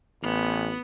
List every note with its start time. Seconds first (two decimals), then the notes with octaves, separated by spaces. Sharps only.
0.23 A1 B3